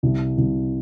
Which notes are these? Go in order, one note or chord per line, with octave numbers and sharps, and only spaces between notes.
C2
C2